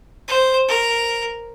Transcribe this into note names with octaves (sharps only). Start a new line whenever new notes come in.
C5
A#4